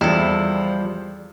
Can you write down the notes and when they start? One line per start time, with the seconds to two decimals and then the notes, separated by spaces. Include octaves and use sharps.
0.01 E2 F3 G3 E4 A4